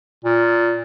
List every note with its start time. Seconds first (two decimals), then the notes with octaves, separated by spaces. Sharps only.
0.24 A#2